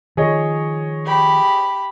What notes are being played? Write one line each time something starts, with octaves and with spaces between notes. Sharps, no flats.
D#3 F3 G#4 C#5 D#5
G4 B5